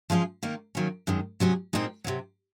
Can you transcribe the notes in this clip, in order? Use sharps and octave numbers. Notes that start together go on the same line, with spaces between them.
F3 G#3 C#4 F4 G#4
D#3 A#3 D#4
D#3 F#3 A#3 C#4
F#2 D#3 G#3
C3 F#3 C#4 G#4
A#2 F3 C4 D#4 G#4
C3 D#3 F#3